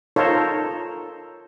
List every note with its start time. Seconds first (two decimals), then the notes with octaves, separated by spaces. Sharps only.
0.16 D#4 F4 A4 A#4 C5 C#5